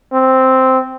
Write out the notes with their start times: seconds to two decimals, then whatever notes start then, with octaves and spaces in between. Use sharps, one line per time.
0.13 C4